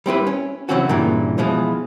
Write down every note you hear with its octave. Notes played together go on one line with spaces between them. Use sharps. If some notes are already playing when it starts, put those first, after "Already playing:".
G3 C4 E4 B4
C#4
C#3 E3 F#3 C4 C#4 F#4
G2 A#2 C#3 E3
B2 E3 F3 G#3